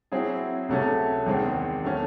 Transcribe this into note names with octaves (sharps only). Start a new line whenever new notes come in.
F#3 C4 E4 G#4
C#2 C3 F#3 A3 C#4
E2 D#3 G#3 C4
F#3 A3 C#4